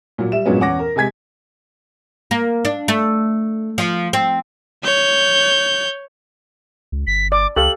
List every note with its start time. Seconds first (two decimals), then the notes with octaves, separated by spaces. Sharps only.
0.18 A#2 F#3
0.32 G3 E5 E7
0.45 G2 A#2 F#3 G#3 B3 C#4
0.60 E2 C#4 F#5 D6 A#6
0.79 A#4
0.96 C3 G#3 G#5 G#6 B6
2.31 A#3
2.65 D4
2.88 A3
3.78 F3
4.13 C4
4.84 C#5 G6
6.92 C#2
7.07 G1 B6
7.32 D5 D6
7.56 C#2 G4 A4 F5 F#7